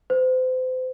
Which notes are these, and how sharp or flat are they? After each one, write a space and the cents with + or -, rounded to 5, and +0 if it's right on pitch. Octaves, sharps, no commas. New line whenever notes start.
C5 -35